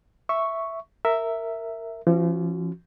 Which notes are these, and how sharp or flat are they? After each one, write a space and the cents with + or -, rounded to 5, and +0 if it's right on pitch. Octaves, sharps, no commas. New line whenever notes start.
E5 +0 C#6 +0
A#4 -15 E5 +0
F3 -40 C#4 -15 F#4 +0